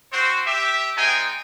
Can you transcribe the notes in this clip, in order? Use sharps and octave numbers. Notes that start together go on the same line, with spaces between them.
C4 F#4 C5
G4 E5
G#3 C4 D#4 G5 G#5